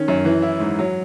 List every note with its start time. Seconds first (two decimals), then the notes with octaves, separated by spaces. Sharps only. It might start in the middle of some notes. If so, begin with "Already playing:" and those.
Already playing: D#3 C#4
0.08 F#2
0.25 E3
0.42 E4
0.60 G#2
0.79 F#3